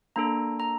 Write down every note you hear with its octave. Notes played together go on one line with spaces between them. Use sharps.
A#3 D4 A4 A#5
A#5